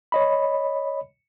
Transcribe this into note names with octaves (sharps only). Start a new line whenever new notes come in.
C#5 D#5 B5